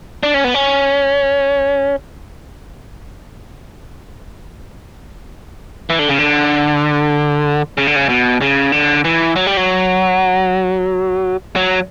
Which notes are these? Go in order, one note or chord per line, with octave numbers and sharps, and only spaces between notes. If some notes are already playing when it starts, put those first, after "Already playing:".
D4
C#4
B3
C#4
E3
D3
C#3
D3
C#3
D3
C#3
B2
C#3
D3
E3
F#3
G3
F#3
F#3